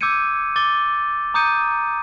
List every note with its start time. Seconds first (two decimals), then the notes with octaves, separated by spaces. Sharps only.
0.01 D6 E6 G6 G#6 C#7 D#7
0.56 D6 A6 G7
1.34 A#5 D6 D#6 G6 C#7 D#7